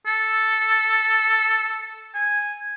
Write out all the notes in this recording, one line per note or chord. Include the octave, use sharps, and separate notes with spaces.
A4
G#5